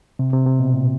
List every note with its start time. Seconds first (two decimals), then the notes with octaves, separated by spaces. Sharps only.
0.19 C3
0.33 C3
0.46 C3
0.60 B2
0.74 A#2